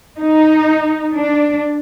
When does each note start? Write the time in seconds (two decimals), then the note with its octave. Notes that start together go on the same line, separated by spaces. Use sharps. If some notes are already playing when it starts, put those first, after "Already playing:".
0.17 D#4
1.14 D4